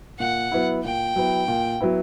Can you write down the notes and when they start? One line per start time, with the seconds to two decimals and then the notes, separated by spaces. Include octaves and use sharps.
0.19 A#2 F#5
0.52 F#3 B3 E4
0.84 A#2 G5
1.16 F#3 B3 E4
1.48 A#2
1.81 F#3 B3 E4